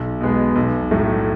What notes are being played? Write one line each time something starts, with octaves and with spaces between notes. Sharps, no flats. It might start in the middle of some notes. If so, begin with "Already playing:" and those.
Already playing: B1
B2 G#3 B3
B1
A2 F#3 A3